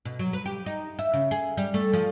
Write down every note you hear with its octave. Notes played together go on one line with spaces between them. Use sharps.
B2
F#3
B4
G4
D#4
E5
C#3
G#4
G3
A3
F3